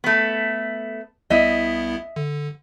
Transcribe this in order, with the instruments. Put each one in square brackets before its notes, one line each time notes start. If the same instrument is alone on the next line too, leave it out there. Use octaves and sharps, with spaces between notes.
[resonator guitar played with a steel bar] A3 B3
[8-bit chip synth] C2 B3 E4 [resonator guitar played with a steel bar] D#5 E5
[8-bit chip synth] D3